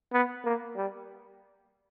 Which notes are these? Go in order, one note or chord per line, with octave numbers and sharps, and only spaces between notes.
B3
A#3
G3